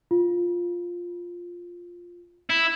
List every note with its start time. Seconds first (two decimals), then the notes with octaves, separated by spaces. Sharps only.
0.11 F4
2.50 E4